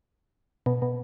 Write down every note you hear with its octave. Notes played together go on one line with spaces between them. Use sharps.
B2
B2